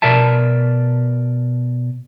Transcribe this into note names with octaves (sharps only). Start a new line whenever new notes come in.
B2 A#4 D5 E5 A5